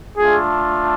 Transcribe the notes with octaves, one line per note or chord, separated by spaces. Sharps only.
A3 D4 F4 G#4